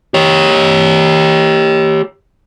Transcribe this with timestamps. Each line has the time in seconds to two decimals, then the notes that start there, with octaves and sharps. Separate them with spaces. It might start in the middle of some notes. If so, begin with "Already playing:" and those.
0.14 G4 C#5